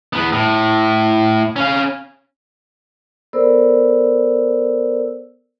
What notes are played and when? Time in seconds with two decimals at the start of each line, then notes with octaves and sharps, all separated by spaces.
0.13 E2 B3
0.32 A2
1.56 C#4 F5
3.33 B3 A4 A#4 C5 D5 E6